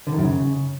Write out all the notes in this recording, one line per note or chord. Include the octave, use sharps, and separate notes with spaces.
D3
D#3
F#2
C#3